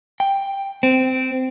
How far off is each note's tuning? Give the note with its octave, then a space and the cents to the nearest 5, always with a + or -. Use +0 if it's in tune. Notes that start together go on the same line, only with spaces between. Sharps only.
G5 +5
C4 -15